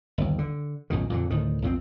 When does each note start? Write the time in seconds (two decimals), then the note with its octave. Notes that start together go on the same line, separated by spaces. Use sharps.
0.18 G1 D#2
0.38 D3
0.90 B1 F#2 A#2 D#3
1.10 F2 A#2 D3
1.30 D2 A2 D#3
1.62 B1 F2 F#3 C4